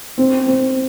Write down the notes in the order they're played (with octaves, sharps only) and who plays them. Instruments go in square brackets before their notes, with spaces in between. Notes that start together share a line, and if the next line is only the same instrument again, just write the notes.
[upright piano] C4
C4